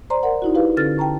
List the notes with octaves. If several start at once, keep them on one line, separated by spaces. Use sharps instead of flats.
C5 D5 A#5 C6
A#4 D5 F#5
D#4 E4 F#4
E4 G4 B4 F5
D3 C#4 A4 F6 A6
G5 A5 A#5 C#6